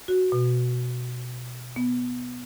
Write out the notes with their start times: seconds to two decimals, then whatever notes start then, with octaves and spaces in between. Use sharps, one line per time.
0.08 F#4
0.32 B2
1.76 B3